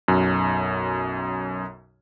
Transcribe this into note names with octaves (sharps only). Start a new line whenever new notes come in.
B1 F#2